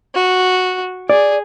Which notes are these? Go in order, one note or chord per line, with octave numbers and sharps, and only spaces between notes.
F#4
G#4 D5